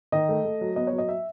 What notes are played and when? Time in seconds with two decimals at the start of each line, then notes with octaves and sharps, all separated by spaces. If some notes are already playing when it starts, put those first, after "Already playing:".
0.12 D#3 D#5
0.29 A3
0.44 A3
0.61 F#3
0.76 B3 D#5
0.87 C#5
0.92 F#3
0.98 D#5
1.08 E5